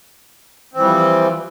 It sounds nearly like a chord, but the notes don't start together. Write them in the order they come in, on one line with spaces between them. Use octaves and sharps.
C4 E3 G3 F3